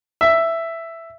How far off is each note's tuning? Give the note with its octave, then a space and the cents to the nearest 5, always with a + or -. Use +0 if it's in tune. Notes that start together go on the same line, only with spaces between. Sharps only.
E5 +5